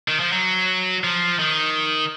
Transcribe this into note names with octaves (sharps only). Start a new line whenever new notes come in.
D#3
F3
F#3
F3
D#3